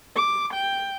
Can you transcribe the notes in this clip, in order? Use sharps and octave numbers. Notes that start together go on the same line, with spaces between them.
D6
G5